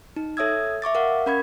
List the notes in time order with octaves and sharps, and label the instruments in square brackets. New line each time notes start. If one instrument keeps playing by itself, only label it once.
[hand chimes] D#4
A4 C#5 E5 D#6 E6 G#6
E5 C#6 D6 A6
A#4 F5 F#5
C#4 A#4 B5 C#6 G#6